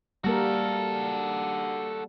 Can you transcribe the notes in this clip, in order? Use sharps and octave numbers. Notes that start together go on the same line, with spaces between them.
G3 A#3 F#4 A4 A#4